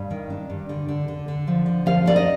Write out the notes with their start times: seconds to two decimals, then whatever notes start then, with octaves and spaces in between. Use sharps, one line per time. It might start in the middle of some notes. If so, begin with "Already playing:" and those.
Already playing: G2 F5
0.11 D#3
0.30 D4
0.50 G2
0.69 D3
0.89 D3
1.08 D3
1.28 D3
1.48 F3
1.66 D3
1.86 F3 F5
2.06 D#4 D5
2.16 D#5